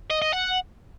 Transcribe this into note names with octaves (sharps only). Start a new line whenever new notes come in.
D#5
D#5
F#5